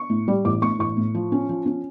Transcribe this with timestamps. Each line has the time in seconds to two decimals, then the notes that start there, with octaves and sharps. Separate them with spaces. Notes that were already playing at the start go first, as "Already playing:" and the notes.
Already playing: C#6
0.10 A2
0.28 G3
0.45 A1 D6
0.62 A2 C#6
0.79 A1 C#6
0.97 A2
1.15 F3
1.32 C#4
1.49 F3
1.66 C#4